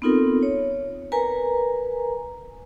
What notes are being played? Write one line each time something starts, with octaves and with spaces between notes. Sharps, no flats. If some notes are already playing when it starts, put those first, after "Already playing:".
B3 C4 D#4 F4 A4 A#4
C#5
A#4 B4 G#5 A#5